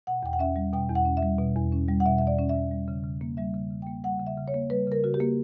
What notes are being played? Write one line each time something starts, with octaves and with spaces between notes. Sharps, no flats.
B2 F#5
E2 G5
F#5
C#4 E5
G3
B2 G5
E2
F#5
C#4
E5
G3
B2
E2
C#4
G3
F#5
B2 E5
E2 E5
D5
C#4
E5
G3
G3
C#3
C#3
A#3
G3 E5
C#3
C#3
A#3 G5
G3 F#5
C#3
E5
C#3
C#5
A#3
G3 B4
C#3 A#4
C#3 F#4
G4
A#3